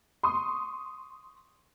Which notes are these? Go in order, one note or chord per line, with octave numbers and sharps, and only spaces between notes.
C6 C#6 D#6